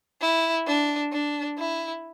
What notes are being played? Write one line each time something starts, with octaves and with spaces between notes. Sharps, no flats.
E4
D4
D4
E4